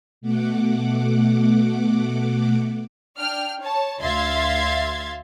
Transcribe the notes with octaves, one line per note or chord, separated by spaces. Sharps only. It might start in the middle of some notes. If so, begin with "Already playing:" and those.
B2 A3 F#5 D6
D4 G5 F6
C#5 A5
D2 E5 F5 C6 G#6 A6